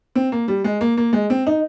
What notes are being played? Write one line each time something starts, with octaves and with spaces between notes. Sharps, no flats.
C4
A#3
G3
G#3
A#3
A#3
G#3
C4
D#4